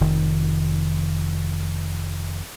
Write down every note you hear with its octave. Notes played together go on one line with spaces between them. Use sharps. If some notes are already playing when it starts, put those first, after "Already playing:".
F1 D#3